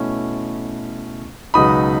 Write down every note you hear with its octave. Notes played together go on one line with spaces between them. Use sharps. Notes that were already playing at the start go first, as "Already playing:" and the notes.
Already playing: B2 A3 C#4 E4
C#2 B2 F#3 B3 D#4 B5 D#6